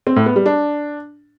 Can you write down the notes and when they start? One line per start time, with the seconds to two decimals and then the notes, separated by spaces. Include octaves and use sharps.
0.07 C4
0.16 A2
0.26 B3
0.36 G3
0.46 D4